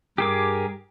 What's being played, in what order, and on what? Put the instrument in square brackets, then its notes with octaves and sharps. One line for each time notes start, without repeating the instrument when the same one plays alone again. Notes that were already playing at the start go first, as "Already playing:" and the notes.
[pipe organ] G2 A#4 [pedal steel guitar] G4 G#4 D6